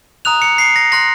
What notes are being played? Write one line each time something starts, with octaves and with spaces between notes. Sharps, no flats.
A#5 D#6 F#6 F7
C#7
C7
A#6
C6 F#6 A#6